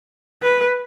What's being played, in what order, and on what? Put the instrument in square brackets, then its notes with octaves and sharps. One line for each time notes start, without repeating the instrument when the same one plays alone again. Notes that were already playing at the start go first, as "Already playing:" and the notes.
[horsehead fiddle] B4